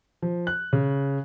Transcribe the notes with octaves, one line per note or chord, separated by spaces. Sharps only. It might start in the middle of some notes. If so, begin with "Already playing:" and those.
F3
F#6
C#3